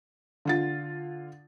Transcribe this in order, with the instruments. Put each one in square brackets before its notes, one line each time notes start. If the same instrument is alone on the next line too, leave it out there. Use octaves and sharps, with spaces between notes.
[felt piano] D3 F4 A6